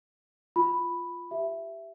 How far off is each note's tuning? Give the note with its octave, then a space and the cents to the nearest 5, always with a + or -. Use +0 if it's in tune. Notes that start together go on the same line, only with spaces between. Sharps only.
F4 +0 B5 +0
G4 +0 E5 +10